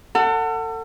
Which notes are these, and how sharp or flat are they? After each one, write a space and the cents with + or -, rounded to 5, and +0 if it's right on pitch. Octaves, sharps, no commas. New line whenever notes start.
A4 +35 F#5 +0